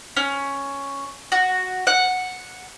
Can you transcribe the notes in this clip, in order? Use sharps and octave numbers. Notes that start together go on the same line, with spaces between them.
C#4
F#4
F#5